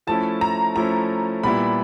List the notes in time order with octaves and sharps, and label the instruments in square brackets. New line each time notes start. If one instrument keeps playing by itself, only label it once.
[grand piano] F3 A3 C#4 E4 [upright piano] A5
[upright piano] A#5
[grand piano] F3 A3 C#4 E4 [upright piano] A#5
[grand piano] A#2 G3 B3 E4 [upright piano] B5